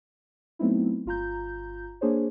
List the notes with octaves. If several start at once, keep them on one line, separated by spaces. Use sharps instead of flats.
F#3 A3 B3 C4 D#4 E4
G1 F4 A#5 G6
A#3 D4 G#4 C5 C#5